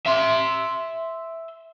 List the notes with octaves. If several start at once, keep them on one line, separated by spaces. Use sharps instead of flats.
E5 C6